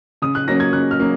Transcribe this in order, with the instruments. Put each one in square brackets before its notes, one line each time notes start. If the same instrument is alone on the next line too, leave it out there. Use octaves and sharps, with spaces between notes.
[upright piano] C#3 D#6
F#6
F#3 A#3 C#4 A#6
G#6
C#3 F#6
F6
F#3 A#3 C#4